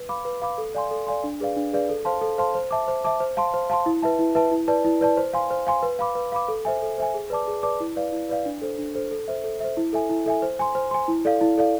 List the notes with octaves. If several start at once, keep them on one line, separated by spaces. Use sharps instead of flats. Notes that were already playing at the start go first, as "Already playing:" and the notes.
Already playing: B4
F5 B5 D6
B4
F5 B5 D6
A4
D5 F5 G#5 C6
A4
D5 F5 G#5 C6
D4
G#4 B4 D5 F5
D4
G#4 B4 D5 F5
A4
C5 F5 A5 C6
A4
C5 F5 A5 C6
C5
E5 A5 D6
C5
E5 A5 D6
C5
F5 A5 C6
C5
F5 A5 C6
E4
B4 E5 A5
E4
B4 E5 A5
E4
B4 D5 A5
E4
B4 D5 A5
C5
F5 G#5 C6
C5
F5 G#5 C6
B4
F5 B5 D6
B4
F5 B5 D6
A4
C5 E5 G#5
A4
C5 E5 G#5
G#4
B4 D5 A5 D6
G#4
B4 D5 A5 D6
E4
B4 D5 F5
E4
B4 D5 F5
D4
A4 C5
D4
A4 C5
A4
C5 E5
A4
C5 E5
E4
A4 E5 G#5
E4
A4 E5 G#5
C5
G#5 C6
C5
G#5 C6
E4
A4 D5 F5
E4
A4 D5 F5